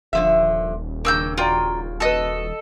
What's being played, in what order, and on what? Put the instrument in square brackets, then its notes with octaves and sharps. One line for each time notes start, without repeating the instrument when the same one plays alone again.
[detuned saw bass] D#1 [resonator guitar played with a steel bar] D3 F3 E5
[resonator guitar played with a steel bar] G2 C#3 [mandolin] A#3 E6 G6
[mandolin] F4 G5 [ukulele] F#4 D5 A#5
[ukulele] F#4 B4 [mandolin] A4 D#5